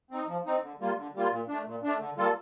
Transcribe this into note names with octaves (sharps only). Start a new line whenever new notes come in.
C4 D#4
F3
C4 D#4
D3
G3 A#3 F4
D3
G3 A#3 F4
A#2
A3 D4
A#2
A3 D4
D3
G3 A#3 F4 A4